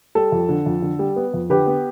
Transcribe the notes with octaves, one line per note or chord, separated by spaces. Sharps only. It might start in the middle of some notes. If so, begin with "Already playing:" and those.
G3 A4
F2
D3
F2
D3
G3
B3
F2
D3 G4 B4
B3